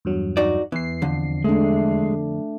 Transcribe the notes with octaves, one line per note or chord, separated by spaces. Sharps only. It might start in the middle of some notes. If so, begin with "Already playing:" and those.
E2 G2 F#3
D#4 F#4 D5
E2 E3 C7
F2 D3
G#3 A3 D4